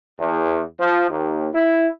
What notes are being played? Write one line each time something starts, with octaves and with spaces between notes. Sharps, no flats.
E2
F3
D#2
E4